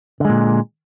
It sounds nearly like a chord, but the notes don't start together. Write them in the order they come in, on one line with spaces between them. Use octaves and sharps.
D3 G#3 A#2